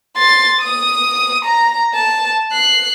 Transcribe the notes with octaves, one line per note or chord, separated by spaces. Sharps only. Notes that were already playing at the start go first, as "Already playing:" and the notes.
C6 A6
D#6
A#5
A5
F#6 C7